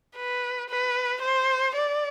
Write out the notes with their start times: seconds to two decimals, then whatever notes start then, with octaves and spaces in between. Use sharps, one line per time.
0.16 B4
0.69 B4
1.22 C5
1.75 D5